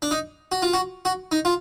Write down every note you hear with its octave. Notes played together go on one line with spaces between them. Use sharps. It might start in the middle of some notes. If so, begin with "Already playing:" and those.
D4
D#4
F#4
F4
F#4
F#4
D#4
F4